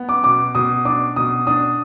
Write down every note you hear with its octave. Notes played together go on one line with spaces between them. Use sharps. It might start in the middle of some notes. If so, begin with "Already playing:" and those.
Already playing: B3
D6
B2 D6
B2 D#6
D4 D6
B2 D#6
D4 D#6